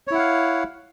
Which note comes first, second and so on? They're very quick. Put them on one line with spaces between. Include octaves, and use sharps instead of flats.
C#5 E4 F#5 F5